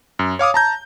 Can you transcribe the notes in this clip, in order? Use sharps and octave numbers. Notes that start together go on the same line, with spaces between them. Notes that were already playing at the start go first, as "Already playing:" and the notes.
F#2
C#5 F5 D6 D#6
A5 A#5 G6